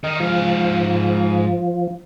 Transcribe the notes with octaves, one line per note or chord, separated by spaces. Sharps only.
D#3 A#4 D#5
G#2 F3 F5